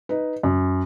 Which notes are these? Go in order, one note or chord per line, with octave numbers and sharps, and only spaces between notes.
D#4 B4
F#2